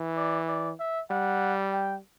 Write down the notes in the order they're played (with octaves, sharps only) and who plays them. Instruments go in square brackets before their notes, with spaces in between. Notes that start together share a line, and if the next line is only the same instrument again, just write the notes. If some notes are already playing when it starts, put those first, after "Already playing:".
Already playing: [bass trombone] E3
[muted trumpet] D5
D5
E5
[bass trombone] G3 [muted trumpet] F#5
[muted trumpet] G5